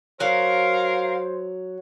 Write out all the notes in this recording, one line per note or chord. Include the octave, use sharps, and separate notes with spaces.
F#3 A#4 C5 F5